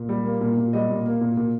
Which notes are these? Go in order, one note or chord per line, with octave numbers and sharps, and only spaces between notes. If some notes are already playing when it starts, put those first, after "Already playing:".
Already playing: A#2
G3
A#3
A#2
A#2
G3 D#5
A#2
A#3
A#2
A#2